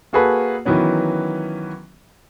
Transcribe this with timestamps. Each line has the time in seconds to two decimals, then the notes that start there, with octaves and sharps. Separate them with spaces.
0.13 A#3 F#4 G#4 A4 B4
0.65 D#3 E3 F#3 B3 C#4